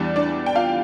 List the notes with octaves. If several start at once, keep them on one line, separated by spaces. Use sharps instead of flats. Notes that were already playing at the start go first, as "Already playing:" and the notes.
Already playing: E2 E3 G3 D4 D5
D4 D5
G5
F4 F5